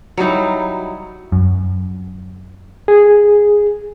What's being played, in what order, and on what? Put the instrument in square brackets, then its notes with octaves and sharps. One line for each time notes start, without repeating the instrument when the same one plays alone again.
[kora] F#3 G3 D#4 E4
[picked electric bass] F#2
[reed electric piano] G#4